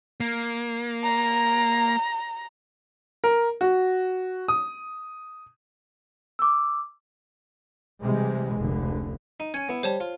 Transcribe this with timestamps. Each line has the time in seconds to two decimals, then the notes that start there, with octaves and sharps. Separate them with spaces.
0.20 A#3
1.04 A#5
3.24 A#4
3.61 F#4
4.48 D#6
6.39 D6 E6
8.02 C3 E3 G3 G#3 C4
8.56 F1 C#2 D3
9.40 D#4
9.54 C#4 G#5 G#6
9.69 B3 E4
9.83 G3 C5 C#5 A5
10.00 F4